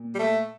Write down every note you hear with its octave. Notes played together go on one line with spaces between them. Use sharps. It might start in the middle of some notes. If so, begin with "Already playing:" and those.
Already playing: A#2
G3
A3